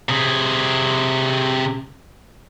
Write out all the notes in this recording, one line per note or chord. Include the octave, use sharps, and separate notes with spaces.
C3 G#4